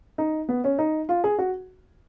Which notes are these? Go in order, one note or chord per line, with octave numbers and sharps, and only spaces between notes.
D#4
B3
C#4
D#4
F4
G#4
F#4